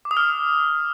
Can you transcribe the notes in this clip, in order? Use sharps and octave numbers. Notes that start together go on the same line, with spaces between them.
D6
D#6
F6